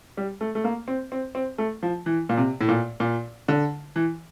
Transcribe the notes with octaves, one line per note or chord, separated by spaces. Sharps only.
G3
A3
A3
A#3
C4
C4
C4
A3
F3
E3
A#2
C3
A2
A#2
A#2
D3
E3